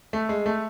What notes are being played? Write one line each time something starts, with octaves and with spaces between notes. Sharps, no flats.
A3
G#3
A3